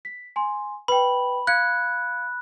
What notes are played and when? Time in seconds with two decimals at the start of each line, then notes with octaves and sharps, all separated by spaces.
0.05 B6
0.36 G#5 C6
0.88 B4 G5 B5
1.47 F5 F#6 G#6 C#7